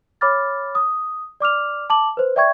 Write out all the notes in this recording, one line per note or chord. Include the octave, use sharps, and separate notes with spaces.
C#5 B5 D6 F6 A6
D#6
D5 D6 F6 F7
A5 D6 F#7
B4 C5
D5 E5 G5 C#6 G#6